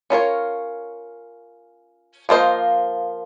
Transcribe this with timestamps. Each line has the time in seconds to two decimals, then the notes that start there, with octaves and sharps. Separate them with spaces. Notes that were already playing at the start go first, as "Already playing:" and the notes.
0.10 C#4 F4 A#4 C#5
2.29 F3 A#3 F4 C5 D#5